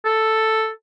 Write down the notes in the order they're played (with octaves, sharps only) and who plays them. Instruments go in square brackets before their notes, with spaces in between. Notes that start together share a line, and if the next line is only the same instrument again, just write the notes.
[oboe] A4